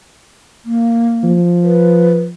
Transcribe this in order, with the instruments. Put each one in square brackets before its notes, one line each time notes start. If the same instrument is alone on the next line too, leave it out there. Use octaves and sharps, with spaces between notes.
[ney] A#3
[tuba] F3
[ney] B4